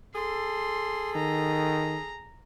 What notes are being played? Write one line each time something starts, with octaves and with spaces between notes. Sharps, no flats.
G#4 A4 C6
D#3 A#5